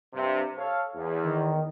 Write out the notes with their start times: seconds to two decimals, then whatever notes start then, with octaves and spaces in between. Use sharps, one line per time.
0.13 G2 C3
0.58 A4 C#5 F5
0.95 E2
1.25 D#3